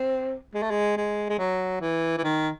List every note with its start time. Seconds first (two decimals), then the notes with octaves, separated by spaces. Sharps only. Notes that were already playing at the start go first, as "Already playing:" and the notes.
Already playing: C4
0.54 G#3
0.62 A3
0.70 G#3
0.97 G#3
1.30 G#3
1.39 F#3
1.81 E3
2.18 E3
2.24 D#3